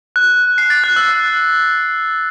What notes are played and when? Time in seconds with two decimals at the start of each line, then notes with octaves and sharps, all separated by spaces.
0.16 F#6
0.58 C7
0.70 A6
0.84 F#6
0.96 E6